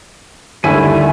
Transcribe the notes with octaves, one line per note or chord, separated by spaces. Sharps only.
D#2 D3 G3 A3 E4 G#5 E6